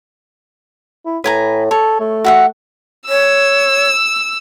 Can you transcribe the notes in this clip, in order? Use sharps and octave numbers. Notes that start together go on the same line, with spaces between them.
E4
A2 B4 G#5 A#5
A4 C#5
A3
F#4 E5 F#5
C#5 E6